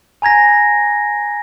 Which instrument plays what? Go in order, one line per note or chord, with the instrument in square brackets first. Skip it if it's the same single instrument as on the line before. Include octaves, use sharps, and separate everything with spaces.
[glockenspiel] G#5 A#5 G#6 A#6